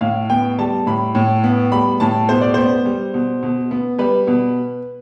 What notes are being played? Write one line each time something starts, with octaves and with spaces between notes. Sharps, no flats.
A2 F5
B3 G5
G3 A5
A2 B5
A2
B3
G3 B5
A2 A5
B2 C5
D5
B3 C5
G3
B2
B2
B3
G3 B4
B2